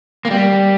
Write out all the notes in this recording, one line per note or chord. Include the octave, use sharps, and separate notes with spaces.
A#3
G3